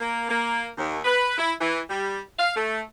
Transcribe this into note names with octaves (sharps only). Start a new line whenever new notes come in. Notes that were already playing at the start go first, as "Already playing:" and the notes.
A#3
A#3
D#2
B4
E4
E3
G3
F5
A3